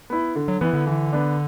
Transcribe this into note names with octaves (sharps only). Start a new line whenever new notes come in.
B3 E4
D3
F#3
E3 B3 E4
D3
E3
B3 D4